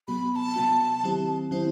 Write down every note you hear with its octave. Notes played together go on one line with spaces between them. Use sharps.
C3 F#3 B3 F#4 B5
B5
A5
C3 F#3 B3 F#4
D#3 F#3 C4 E4 G4
D#3 F#3 C4 E4 G4 C5